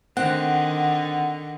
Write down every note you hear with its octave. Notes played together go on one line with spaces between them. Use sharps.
D3 D#3 C4 F#5